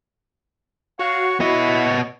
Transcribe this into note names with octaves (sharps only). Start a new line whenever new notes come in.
F#4 C#5 F5
B3 E4 C#5 D#5